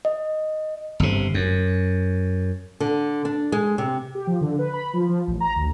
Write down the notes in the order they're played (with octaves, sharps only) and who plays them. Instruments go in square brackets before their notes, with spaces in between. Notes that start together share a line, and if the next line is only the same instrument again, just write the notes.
[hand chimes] D#5
[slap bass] G1 C3
F#2
[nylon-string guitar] D3
D4
G#3
C3
[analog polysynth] G4
F3
D3
B4
B5
F3
F3
A1
A#5
D2